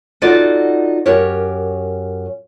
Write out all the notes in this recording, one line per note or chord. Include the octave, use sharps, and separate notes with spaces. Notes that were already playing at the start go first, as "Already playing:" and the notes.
D#4 F4 F#4 A4 D5
F#2 G4 A#4 C#5